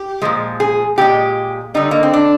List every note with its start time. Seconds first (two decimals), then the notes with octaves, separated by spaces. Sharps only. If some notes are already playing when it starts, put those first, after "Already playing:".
Already playing: G4
0.22 A#2 F3 G#3
0.60 G#4
0.98 A#2 G#3 G4
1.74 D3 G3 D#4
1.91 A#3
2.03 C4
2.13 D4